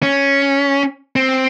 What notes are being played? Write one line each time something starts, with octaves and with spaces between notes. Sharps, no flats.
C#4
C4